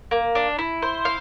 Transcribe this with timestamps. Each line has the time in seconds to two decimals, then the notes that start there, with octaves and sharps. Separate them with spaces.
0.11 A#3
0.35 D4
0.59 E4
0.82 C5
1.05 F5